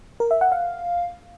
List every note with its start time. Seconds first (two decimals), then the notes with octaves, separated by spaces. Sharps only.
0.20 A#4
0.31 E5
0.41 F#5
0.52 F5